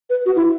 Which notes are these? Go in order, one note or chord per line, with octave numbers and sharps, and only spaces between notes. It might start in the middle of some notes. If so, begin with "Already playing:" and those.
B4
F#4
E4